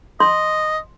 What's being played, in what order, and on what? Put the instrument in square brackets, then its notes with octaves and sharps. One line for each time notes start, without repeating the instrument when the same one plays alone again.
[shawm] D#5 [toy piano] C6